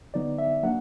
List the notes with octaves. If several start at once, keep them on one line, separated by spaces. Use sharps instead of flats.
D3 F#3 B3 D#4 D5
E5
F#3 A#3 D4 F#5